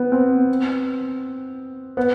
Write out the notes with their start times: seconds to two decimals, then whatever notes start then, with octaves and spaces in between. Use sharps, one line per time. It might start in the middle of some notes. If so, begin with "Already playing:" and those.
Already playing: B3
0.12 C4
1.97 B3